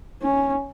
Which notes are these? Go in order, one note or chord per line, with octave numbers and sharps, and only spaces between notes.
C#4